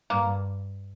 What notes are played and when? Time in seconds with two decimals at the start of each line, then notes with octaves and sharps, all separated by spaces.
0.10 G2 A#3